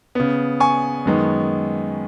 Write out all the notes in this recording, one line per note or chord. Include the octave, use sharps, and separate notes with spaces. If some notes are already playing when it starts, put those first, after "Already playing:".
C#3 B3
G#5 C#6
F#2 D#3 G#3 B3